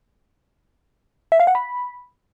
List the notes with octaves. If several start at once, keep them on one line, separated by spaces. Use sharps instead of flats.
E5
F5
F#5
B5